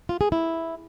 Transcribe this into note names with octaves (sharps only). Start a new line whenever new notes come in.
F4
G#4
E4